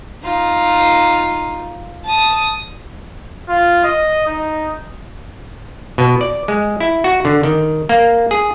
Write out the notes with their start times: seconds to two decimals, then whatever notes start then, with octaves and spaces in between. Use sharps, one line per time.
0.24 D#4 F4
2.05 A5 D#6
3.49 F4
3.84 D#5
4.27 D#4
5.98 B2
6.21 D5
6.48 G#3
6.80 E4
7.04 F#4
7.25 D3
7.43 D#3
7.89 A#3
8.31 G#4